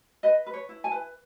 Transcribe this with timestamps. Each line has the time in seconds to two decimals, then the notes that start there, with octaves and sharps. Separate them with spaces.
0.23 B4 D#5
0.46 B4
0.53 C#5
0.69 E4
0.84 G#5
0.92 B4